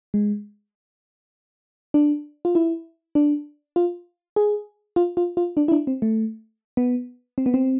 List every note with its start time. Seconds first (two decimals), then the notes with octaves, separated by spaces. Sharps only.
0.14 G#3
1.94 D4
2.45 F4
2.55 E4
3.15 D4
3.76 F4
4.36 G#4
4.96 F4
5.17 F4
5.37 F4
5.57 D4
5.68 E4
5.72 D4
5.87 C4
6.02 A3
6.77 B3
7.38 C4
7.46 B3
7.54 C4